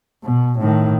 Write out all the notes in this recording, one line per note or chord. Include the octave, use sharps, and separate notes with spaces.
B2
A2 D#3